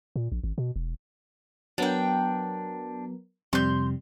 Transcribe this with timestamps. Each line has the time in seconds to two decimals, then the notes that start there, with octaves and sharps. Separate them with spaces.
0.16 A#2
0.32 A#1
0.44 G#1
0.58 B2
0.76 E1
1.78 F#3 B3 D4 A#4 G5
3.53 F2 C3 G3 C6 G6